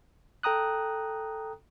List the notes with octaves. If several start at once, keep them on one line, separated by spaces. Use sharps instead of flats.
A4 G5 A#5 D#6 F#6